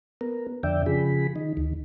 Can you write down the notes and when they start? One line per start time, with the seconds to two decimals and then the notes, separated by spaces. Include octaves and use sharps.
0.21 B3 A#4
0.63 F2 D3 D5 E5 G5
0.86 C#3 F3 G#4 B5
1.36 D#3 D#4
1.57 D2 D#3